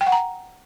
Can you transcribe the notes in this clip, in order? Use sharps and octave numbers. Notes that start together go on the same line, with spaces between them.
G5
F#5
A#5